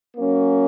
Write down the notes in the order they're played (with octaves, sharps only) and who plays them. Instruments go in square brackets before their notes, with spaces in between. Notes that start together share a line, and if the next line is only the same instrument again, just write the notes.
[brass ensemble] F#3 A#3 C#4